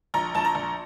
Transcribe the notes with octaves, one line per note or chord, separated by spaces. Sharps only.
A#1 A#5
A#1 A5
A#5
A#1